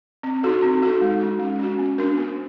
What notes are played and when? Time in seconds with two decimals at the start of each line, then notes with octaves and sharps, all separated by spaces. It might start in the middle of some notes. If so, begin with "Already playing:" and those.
0.23 C4
0.43 D#4 F#4 A4
0.62 C4
0.82 D#4 F#4 A4
1.01 G#3
1.21 C#4 F#4
1.40 G#3
1.59 C#4 F#4
1.79 B3
1.98 D4 F#4 A#4
2.18 B3